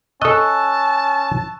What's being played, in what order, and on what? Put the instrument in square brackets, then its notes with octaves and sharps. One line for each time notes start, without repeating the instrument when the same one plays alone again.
[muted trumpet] C#4 [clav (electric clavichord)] A4 D#5 [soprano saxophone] A5 [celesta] C#6 E6 F#6